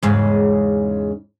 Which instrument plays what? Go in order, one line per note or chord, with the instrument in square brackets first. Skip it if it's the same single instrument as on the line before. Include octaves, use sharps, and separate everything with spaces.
[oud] E2 G#2 C#3